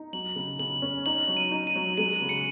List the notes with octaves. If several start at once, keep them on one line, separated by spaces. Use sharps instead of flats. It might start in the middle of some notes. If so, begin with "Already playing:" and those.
Already playing: D#4
F#3 F#7
C#3
C#3 F#7
C#4
D#4 F#7
F#3
D#7
D#4
D#7
F#3
G#3 D#7
C#3
C#7